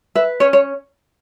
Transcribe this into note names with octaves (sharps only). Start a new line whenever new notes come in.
B4 E5
C#4 C#5
C#5